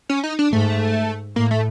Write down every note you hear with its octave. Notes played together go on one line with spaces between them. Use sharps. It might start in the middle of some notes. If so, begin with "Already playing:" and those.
C#4
D#4
D4
G#2 A3
A2 A#3
A3